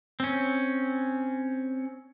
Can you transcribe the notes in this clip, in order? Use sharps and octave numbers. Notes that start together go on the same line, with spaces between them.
C4 C#4